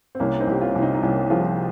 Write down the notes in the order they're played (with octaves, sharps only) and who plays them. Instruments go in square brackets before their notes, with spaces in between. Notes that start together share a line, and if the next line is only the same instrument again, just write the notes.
[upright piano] C4
[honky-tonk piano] C2 [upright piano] A#3 C#4
[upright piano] C4 D#4
[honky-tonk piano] C2 [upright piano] G4
[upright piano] C#4 F4
[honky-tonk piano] C2
[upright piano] C4 D#4
D#4
[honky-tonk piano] C2 [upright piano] A#3 C#4
[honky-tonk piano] F3 [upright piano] F4 G#4